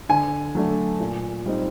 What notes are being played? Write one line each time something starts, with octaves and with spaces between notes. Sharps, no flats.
D3 G#5
F#3 A3 D4
A#2
G3 C4 D#4